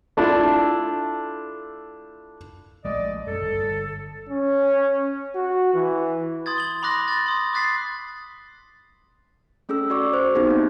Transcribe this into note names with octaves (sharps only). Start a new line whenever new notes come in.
A3 D4 E4 F4 A4
A#1 G#3 A3 D5 D#5
F#2 A4
G1
C#4
F#4
E3
C6 D#6 G#6 A6
F#7 G7
B5 C6 D6 D#6 F#6 A#6
A6
C6 D#6 G#6
D6 D#6 F#6 A6 B6 C7
A3 C#4 G#4 A4 E6
F#4 D5 C#6 D6
C5
B3 C4 D#4 G4 G#4
A#3